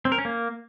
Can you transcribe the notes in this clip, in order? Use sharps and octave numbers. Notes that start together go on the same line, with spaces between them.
C4
A#4
C#4
A#3